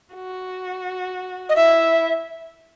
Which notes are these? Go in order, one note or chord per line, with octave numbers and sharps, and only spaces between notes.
F#4
D#5
E4 E5